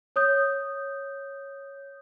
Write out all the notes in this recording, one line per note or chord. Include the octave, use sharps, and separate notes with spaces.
C#5 D#6 G6